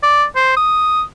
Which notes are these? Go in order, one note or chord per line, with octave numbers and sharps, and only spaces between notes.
D5
C5
D#6